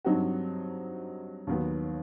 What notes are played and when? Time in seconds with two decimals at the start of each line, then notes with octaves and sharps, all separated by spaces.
0.05 G2 F#3 C4 D#4 F#4
1.47 D#2 D#3 F#3 B3